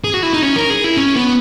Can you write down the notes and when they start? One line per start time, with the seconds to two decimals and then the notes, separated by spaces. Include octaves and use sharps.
0.04 G#4
0.14 F#4
0.23 E4
0.33 D#4
0.42 C#4
0.56 A#4
0.70 G#4
0.84 E4
0.97 C#4
1.16 B3